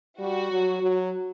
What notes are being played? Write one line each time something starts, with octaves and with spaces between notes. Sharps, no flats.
G3 F#4
F#3
F#3